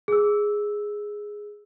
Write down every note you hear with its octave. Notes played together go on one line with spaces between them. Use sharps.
G#4 E6